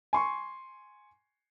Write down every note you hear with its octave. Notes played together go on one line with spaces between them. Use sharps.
G#5 C6 C#6